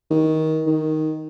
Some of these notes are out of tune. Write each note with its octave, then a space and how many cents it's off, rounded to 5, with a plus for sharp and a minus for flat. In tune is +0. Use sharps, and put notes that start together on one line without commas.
D#3 +20
D#3 +0